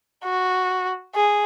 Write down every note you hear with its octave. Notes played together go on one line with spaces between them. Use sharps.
F#4
G#4